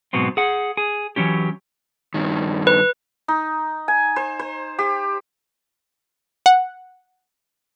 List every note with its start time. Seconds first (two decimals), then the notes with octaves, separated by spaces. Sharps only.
0.13 G#2 B2 F#3 B3 C4
0.37 G#4 F#5
0.77 G#4
1.16 E3 F#3 C#4 G4
2.14 G2 D#3
2.67 B4
3.28 D#4
3.88 G#5
4.16 C5
4.39 C5
4.79 G4
6.46 F#5